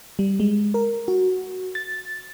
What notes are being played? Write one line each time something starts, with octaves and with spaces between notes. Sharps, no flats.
G3
G#3
A#4
F#4
A6